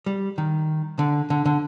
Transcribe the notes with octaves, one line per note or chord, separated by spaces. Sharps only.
G3
D#3
D3
D3
D3